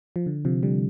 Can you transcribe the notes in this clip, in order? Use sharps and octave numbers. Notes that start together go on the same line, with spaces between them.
F3
D3
C3 F3
D3 G3